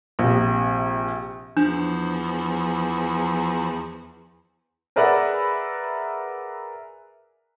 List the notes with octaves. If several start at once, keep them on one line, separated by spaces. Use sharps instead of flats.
A#1 C3
E2 F3 D4
G#4 A#4 B4 D5 E5 F#5